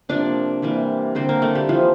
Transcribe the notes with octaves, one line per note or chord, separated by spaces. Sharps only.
C3 F3 A#3 D4 D5
C3 E3 G3 A#3
D3 G3 A#3 C4 C5
A#3 A#4
A3 A4
G3 G4
E3 F3 A#3 F4